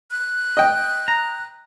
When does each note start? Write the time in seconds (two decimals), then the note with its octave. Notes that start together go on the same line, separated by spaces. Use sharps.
0.11 F#6
0.57 D#5 G5
1.08 A#5